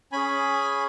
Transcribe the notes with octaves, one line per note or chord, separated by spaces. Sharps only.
C#4 G#4 G#5 B5